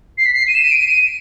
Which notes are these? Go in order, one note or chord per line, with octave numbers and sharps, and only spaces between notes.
C7
B6
C7
D#7
E7
D#7
D7
D#7